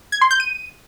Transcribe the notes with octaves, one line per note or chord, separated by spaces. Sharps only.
G#6
C6
G6
D#7